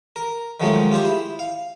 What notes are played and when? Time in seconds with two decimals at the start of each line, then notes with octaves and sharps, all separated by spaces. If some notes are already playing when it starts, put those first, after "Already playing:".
0.16 A#4
0.60 D#3 F3 F#3 G#3 A3 C#4
0.92 F4 G4 G#4 C5
1.05 E4
1.39 F5